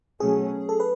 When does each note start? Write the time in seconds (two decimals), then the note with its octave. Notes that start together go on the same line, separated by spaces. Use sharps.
0.20 B2 F#3 A3 C#4 G#4
0.69 A4
0.80 B4